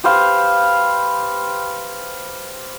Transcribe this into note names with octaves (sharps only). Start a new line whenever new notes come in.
G4 B4 C5 F5